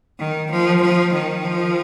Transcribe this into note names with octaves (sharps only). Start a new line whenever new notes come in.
D#3
F3
F3
D#3
F3